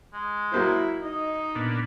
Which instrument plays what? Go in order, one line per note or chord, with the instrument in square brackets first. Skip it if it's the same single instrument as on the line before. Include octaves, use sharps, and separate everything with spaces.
[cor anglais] G#3
[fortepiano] F#3 A#3 C5 [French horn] E4
[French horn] D#4 [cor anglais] D#5
[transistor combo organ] A#2 B3 D4